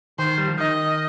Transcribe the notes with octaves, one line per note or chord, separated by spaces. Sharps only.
D#3 C5
G3
F3
D#3 D#5